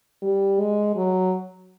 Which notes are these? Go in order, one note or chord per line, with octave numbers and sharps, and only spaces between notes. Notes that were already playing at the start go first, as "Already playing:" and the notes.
G3
G#3
F#3